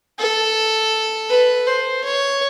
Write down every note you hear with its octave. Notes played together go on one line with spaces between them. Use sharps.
A4
B4
C5
C#5